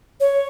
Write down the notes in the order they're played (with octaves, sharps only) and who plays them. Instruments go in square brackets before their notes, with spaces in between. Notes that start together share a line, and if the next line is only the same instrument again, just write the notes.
[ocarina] C#5